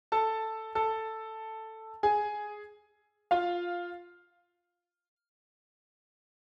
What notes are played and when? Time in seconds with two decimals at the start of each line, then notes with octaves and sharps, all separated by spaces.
0.12 A4 A5
0.75 A4 A5
2.03 G#4 G#5
3.31 F4 F5